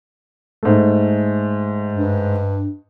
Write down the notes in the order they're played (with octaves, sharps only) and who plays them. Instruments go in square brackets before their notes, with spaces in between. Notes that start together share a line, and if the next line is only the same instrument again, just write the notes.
[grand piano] G#2 A3
[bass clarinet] G2